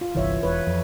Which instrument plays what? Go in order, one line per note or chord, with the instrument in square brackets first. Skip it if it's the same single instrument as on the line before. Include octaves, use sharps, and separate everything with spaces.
[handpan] F4
[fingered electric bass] G1 C2 [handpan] E3 C#5 E5
[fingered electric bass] E1 [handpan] B4 C#5
[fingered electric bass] F2